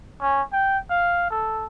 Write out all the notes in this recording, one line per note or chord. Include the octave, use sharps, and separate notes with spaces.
C#4
G5
F5
A4